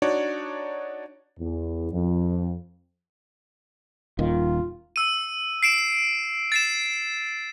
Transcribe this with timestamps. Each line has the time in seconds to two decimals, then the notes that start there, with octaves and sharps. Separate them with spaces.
0.02 D4 D#4 F#4 C#5 D5
1.39 E2
1.91 F2
4.19 D#1 D#3 F4
4.96 E6 D#7
5.63 C7 D7 E7
6.52 A6 C7 E7